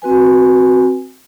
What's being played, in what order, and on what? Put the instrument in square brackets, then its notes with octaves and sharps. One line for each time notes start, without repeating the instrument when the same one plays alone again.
[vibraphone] C4 F#4 B4 G#5